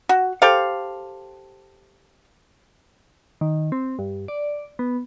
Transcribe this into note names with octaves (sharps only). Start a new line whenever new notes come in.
F#4
G4 A4 C5 F5
D#3
C4
G2
D5
B3